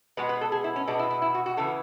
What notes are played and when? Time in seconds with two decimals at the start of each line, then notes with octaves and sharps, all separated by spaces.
0.17 B2 G#3 B3 B4
0.29 B4
0.41 A4
0.52 G#4
0.64 E4
0.76 C#4
0.87 B2 G#3 B3 D4
0.99 E4
1.11 E4
1.22 E4
1.35 F#4
1.46 F#4
1.57 C#3 E3 B3 A4